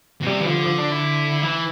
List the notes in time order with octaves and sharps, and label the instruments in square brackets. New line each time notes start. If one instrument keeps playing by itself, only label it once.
[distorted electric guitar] B2
[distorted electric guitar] C3 [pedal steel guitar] G3
[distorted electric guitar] E3
[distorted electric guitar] D3 [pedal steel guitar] F3
[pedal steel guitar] F3
D4
E4
[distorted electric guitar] E3 [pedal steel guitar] E4